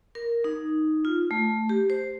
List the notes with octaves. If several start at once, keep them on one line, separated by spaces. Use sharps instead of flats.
A#4
D#4
F4
A3
G4
C5